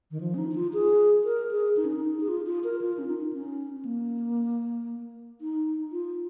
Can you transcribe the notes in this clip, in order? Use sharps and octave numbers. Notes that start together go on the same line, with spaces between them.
D#3
F3
C#4
D#4
D#4
F4
G#4
A#4
G#4
D#4
C#4
D#4
G#4
F4
F4
A#4
F4
C#4
D#4
C#4
C#4
A#3
D#4
F4